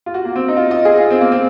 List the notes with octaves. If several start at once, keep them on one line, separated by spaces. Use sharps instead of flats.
F4
F#4
A#3
C4
D#4
F4
D#5
G#4
F4
C4
A#3
C4